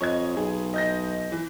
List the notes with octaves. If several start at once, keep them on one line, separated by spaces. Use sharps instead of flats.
F2 C#5 D#5 G#6
B1 G#4
D#5 G6 A#6
E3